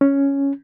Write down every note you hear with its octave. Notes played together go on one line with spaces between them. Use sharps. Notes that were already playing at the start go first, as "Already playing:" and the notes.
C#4